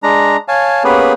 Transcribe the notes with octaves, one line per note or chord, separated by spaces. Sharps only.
G#3 D4 A#5
C#5 F5 G#5 A5
A#3 B3 C#4 G4 G#4 B4